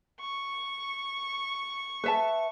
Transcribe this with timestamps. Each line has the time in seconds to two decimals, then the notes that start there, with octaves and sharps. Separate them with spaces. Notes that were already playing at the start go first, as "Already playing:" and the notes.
0.21 C#6
2.04 B4 E5 A5